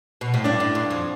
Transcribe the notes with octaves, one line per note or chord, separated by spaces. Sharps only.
B2
A2
G2 D4
A2
G2
F2